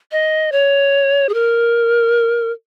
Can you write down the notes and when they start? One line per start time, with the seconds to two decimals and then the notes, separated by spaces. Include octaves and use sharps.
0.12 D#5
0.52 C#5
1.29 G#4
1.34 A#4